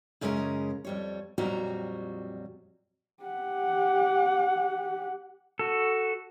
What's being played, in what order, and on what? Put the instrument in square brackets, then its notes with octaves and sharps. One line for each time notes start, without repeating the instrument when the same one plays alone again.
[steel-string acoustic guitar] F#2 C#3 G#3 C#4 F#4 A#4
F2 G3 C#5
F2 A#2 F#3 G3 F#4 A#5
[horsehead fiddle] G4 F#5
[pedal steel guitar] F#4 A4